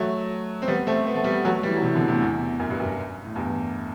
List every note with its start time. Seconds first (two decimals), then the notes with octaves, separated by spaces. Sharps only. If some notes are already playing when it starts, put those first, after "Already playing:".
Already playing: F#3 A3
0.62 C4
0.68 G3 B3
0.87 A3 C4
1.06 B3
1.15 A3
1.24 G3 B3
1.45 F#3 A3
1.63 E3 G3
1.76 F#3
1.82 C3 E3
1.95 B2 D3
2.08 A2 C3
2.21 E2
2.59 F#2
2.70 G2
2.79 F#2
3.25 A2
3.35 E2 G2